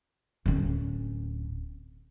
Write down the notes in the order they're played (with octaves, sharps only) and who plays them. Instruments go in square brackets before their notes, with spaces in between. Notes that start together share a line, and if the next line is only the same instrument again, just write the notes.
[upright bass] D1 C#4